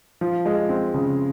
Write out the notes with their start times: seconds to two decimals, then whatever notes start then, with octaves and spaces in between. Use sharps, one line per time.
0.21 F3
0.45 G#3
0.69 C4
0.94 C#3